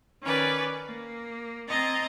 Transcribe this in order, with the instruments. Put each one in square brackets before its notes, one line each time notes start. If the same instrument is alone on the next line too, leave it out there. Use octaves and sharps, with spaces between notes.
[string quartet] D#3 C#4 B4 D5
A#3
C4 D#5 A5 A#5 G#6 A6